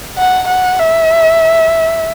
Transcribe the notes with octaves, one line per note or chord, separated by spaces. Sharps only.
F#5
F#5
E5